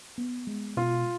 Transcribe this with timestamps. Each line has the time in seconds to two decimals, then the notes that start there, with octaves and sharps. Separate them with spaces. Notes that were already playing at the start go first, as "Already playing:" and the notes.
0.18 B3
0.47 G#3
0.77 B2 F4